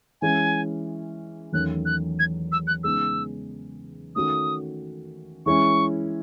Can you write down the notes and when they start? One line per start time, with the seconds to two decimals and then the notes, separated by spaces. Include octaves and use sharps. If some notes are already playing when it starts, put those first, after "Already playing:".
0.21 E3 G#3 C#4 G#5
1.53 E2 D#3 F#3 A3 C#4 F#6
1.85 F#6
2.19 G#6
2.52 E6
2.67 F#6
2.84 C#3 G#3 B3 D#4 E6
4.15 D#3 A3 C#4 F#4 D#6
5.46 E3 G#3 C#4 E4 C#6